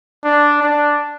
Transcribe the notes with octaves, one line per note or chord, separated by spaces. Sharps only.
D4
D4